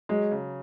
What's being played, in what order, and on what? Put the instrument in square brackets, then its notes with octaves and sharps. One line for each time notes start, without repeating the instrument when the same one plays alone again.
[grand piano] F#3 [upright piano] G#3
[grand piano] C#3